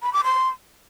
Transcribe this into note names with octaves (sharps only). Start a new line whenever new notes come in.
B5
D6
C6